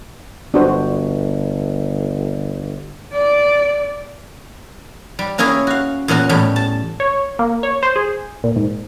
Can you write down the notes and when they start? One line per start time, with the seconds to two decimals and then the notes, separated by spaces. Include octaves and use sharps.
0.54 G1 D4 F#4 C5
3.13 D5
5.19 G3
5.38 A#3 C#4 E4 G#4 A#4
5.67 F#4 F5
6.08 E2 A#2 C#4 F#4
6.29 E2 A2 G3
6.56 A5
7.00 C#5
7.39 A#3
7.63 C#5
7.83 C5
7.96 G#4
8.44 A#2
8.56 G#2